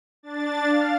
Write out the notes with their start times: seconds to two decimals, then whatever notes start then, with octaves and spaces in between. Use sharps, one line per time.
0.23 D4 A6
0.67 F5